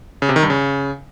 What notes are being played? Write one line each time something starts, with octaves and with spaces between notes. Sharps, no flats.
C#3
C3
D#3
G2
C#3